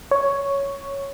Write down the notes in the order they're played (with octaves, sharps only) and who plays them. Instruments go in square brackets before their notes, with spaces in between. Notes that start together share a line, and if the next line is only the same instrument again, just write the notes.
[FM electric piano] C#5